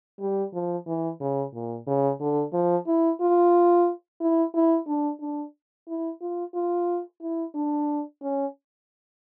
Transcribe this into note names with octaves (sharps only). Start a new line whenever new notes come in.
G3
F3
E3
C#3
A#2
C#3
D3
F3
E4
F4
E4
E4
D4
D4
E4
F4
F4
E4
D4
C#4